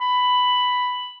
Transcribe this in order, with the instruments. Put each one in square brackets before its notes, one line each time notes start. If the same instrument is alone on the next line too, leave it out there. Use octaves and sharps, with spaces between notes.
[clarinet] B5